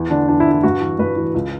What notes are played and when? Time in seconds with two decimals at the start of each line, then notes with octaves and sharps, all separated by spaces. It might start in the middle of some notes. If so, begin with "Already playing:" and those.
Already playing: E2
0.10 D3 D4
0.29 E2 D4
0.40 E4
0.46 D3
0.52 E4
0.63 G2 F#4
0.81 E3
0.99 G2 B4
1.16 E3
1.34 C#2